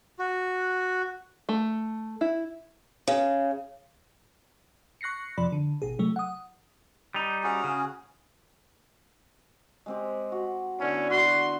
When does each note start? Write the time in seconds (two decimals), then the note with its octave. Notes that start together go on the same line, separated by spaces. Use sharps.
0.19 F#4
1.49 A3
2.21 E4
3.08 C#3
5.01 C#6 F#6 A#6 C7 C#7
5.38 F2 C3 F3 D5 B5
5.52 D3
5.82 G#1 B2 G#4
5.99 C3 F#3 A3
6.16 F#5 D#6
7.14 G3 D#4
7.43 C#4 F#4 G#4
7.64 C#3
9.86 G#3 C4 G4
10.32 F#4
10.80 D3 B3 C#4 E4
11.11 F#4 C6